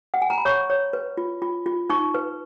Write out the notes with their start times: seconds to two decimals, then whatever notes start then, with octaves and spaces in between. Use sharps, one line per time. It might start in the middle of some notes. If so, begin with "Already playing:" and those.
0.14 F#5
0.22 G#5
0.30 A#5
0.38 B5
0.45 C#5 C#6
0.70 C#5
0.93 B4
1.17 F4
1.42 F4
1.66 F4
1.90 D#4 C#6
2.14 B4